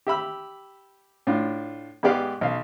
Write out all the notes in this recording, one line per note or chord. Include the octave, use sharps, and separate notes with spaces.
G4 E5 B5 E6
A2 D4 F4
G#2 G#3 B3 G4 D5 F5
B1 F5